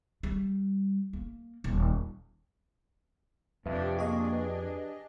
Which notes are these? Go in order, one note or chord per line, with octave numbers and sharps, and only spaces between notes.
G3
A#3
D#1
F2 C3 D4 G4 B4 E5 F5
A#3 D4 G4 G#4 D#5 F5 C#6
B4